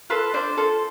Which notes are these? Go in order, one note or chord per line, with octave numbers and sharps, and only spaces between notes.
F4 A4 B4
D4 C5
F4 A4